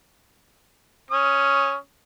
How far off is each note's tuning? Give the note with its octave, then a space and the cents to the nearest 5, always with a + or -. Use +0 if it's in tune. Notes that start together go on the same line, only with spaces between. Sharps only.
C#4 +0 D#6 +15